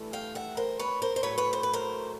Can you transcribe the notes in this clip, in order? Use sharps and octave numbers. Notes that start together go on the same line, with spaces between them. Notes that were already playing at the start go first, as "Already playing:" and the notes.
Already playing: G2 E3 A3
F5 G5
E5 F#5
A#4 C5
B4 C#5
A#4 C5
C5
A2 F#3 A3 B4 C#5
B4 C#5
C5
B4
A#4 C5